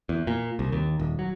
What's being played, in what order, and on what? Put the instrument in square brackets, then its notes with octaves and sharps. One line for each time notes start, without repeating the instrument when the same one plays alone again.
[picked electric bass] E2
A#2
C2
D#2
D#1
F#3